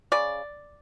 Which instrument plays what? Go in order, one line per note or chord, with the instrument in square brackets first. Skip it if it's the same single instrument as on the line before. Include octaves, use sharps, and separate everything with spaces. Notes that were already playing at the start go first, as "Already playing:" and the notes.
[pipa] C#3 D5